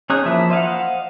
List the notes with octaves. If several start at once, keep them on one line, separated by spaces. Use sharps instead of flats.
C#4 D#4 G#4 F#6
E3 F3 A#3 E4 E5
C5 D#5 F5 F#5